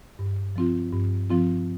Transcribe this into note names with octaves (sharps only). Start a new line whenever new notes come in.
G2
F3 C4 F4
G2
F3 C4 F4